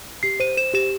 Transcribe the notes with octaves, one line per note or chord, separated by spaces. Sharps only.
G4 C7
C5 D#7
C5 E7
G4 E7